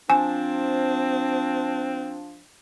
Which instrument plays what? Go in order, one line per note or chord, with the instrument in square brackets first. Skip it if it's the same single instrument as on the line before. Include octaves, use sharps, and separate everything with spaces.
[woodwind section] F3 D4 [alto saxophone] C4 [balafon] G#5